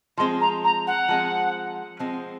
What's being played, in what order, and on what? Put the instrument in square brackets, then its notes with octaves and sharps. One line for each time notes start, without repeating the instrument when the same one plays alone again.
[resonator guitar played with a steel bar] F3 G#3 C4 [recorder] C6
[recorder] A#5
A#5
F#5
[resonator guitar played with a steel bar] F3 G#3 C4
F3 G#3 C4